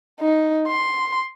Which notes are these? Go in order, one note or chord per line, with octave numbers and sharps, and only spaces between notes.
D#4
C6